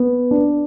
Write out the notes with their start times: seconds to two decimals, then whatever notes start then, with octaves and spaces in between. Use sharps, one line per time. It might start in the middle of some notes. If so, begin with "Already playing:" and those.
Already playing: B3
0.31 D4